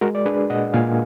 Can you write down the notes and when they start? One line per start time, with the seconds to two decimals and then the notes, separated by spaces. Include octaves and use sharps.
0.01 G#3 F#4 A#4
0.15 D5
0.26 D4 G#4 B4
0.50 A#2 D#5 F#5
0.74 A#2 F5 G#5